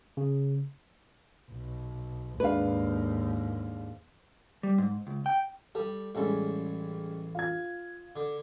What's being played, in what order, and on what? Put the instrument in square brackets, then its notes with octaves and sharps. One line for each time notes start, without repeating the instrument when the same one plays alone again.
[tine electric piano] C#3
[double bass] B1
[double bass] D#2 G#2 [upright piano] G#3 D4 F5 [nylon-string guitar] B4
[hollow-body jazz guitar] G3
G#2
C#2
G5
[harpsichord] G3 [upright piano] A4
[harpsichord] A1 A4 [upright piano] G3 G#3 C#4
[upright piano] F4 G#6
[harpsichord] D3